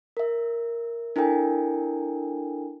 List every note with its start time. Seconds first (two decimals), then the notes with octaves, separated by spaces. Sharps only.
0.17 A#4 E5
1.16 D4 E4 A4 A#4 G5 G#5